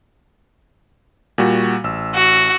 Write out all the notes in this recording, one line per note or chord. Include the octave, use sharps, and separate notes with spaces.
A#2 G3 F#4
A1 E6
F#4